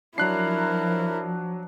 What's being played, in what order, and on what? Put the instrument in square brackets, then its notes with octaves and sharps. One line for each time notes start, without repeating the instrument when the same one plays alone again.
[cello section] F3 [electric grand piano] F#3 F#6 C7 [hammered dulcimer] D4 A#5 [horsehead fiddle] E4 A#4